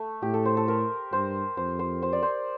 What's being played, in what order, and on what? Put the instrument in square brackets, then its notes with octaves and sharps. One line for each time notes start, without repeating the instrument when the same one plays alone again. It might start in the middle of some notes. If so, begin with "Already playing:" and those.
Already playing: [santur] A3
[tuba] A2 [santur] G4
[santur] A4
C5
A4
A#4
[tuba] G2 [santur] C5
[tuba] F2 [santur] C5
[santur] C5
C5
D5
C5